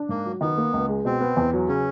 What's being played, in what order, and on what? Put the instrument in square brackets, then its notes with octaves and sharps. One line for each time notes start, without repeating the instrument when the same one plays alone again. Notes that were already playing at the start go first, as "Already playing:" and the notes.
Already playing: [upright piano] D4
[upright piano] G#2 [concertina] A#3
[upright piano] F#3
[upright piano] D#3 [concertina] B3
[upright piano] A#3
C#2
G#3
[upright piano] B2 [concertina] C4
[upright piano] B3
E2
F#3
[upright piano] C#3 [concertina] C#4